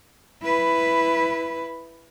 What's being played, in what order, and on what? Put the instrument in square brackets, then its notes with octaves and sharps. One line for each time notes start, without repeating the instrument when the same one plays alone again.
[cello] E4 B4